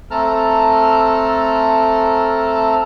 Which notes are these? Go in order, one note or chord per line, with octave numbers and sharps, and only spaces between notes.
A3 C4 A4 A5 A#5 F6